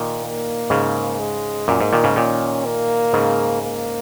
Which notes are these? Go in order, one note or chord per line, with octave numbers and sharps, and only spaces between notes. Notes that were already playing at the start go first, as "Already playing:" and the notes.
Already playing: A#2 D#3
A#3
G#2 C#3
G#3
F#2 A#2 A#3
G#2
A#2 D#3
G#2 C#3
A#2 D#3 C#4
A#3
G#2 C#3
A#3